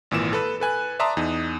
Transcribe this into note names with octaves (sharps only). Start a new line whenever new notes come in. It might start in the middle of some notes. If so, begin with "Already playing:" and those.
G#1 A#2 E3 E7
A4 B4
A4 B4 G#5 F#6
D5 E5 A5 A#5 C6 D#6
E2 D#4